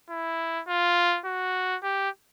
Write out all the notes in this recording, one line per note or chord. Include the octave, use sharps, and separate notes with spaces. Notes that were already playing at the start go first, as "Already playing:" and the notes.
E4
F4
F#4
G4